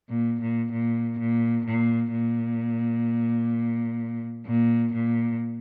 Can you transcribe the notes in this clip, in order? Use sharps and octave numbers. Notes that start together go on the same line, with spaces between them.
A#2
A#2
A#2
A#2
A#2
A#2
A#2
A#2